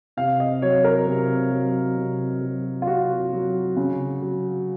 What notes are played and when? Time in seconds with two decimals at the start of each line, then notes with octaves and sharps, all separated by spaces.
0.17 C3 F5
0.40 D#5
0.62 F#3 C#5
0.84 A#4
1.07 C3
1.51 F#3
1.97 C3
2.42 F#3
2.82 F4
2.87 C3 F#4
3.33 F#3
3.77 C#3
4.22 F#3